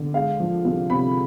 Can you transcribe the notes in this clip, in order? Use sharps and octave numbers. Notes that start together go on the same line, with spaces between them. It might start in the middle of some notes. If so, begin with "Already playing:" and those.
Already playing: D3
G#3 F5
F3
C2
C3 B5